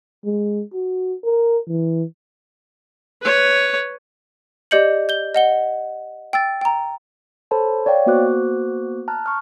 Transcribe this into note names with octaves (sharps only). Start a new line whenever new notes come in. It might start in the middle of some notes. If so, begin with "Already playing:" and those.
G#3
F#4
A#4
E3
B4 C#5
G4 D5 D#5 G6 C#7 F#7
G6 G7
D#5 F#5 G7
G5 E6 A6
G5 A#5
A4 C5 C#5 A5 B5
C#5 D5 F5 G5
A#3 B3 F#4 C5 D6 F#6
A5 A#5 F6 F#6
C#6 F6